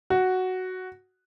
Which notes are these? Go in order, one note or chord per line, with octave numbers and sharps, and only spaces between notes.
F#4